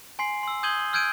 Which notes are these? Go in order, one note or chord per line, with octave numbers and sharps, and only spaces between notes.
G#5 C6 C7
C6 E6
D#6 G6 G#6 D#7 F#7 G7
E6 F6 G6 G#6 D7 D#7